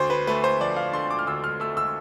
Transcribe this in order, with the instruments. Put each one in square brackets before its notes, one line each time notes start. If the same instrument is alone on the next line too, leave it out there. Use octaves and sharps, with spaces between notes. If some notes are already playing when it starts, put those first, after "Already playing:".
Already playing: [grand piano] D2 C5
B4
A3 B4
C5
F3 D5
F5
D3 C6
D6
F6
D2 E6
F6
A3 E6
E6